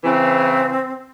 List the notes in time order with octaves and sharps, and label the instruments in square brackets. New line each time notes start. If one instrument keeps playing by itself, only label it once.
[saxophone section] C#3 E3 [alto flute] C4